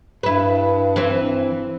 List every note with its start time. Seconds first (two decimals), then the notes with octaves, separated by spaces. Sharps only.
0.23 G2 E4 B4
0.96 E3 C4